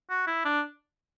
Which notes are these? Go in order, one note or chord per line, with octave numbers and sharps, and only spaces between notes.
F#4
E4
D4